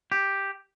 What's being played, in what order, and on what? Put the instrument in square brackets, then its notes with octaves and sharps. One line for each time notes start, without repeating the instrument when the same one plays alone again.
[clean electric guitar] G4